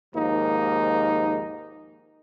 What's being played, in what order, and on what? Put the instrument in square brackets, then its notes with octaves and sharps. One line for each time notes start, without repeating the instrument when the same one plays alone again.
[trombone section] D#2 G#2 F3 A#3 D#4